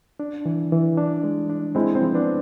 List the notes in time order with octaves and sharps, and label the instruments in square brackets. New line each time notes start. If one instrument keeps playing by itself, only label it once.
[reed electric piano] D4
E3
E3
D4
G#3
D4
[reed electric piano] G#3 [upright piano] C4 E4
[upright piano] C4 E4
[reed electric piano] F3
[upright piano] B3 D4